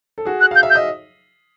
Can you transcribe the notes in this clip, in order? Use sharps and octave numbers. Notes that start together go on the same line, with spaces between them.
A4
F#4 G#4
F#6
F5 G6
E5
G6
D#5